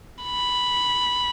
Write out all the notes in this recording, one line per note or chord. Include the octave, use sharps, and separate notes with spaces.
B5